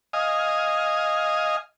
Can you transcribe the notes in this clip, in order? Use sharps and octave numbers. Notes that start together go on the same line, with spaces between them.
D#5 F5 G#5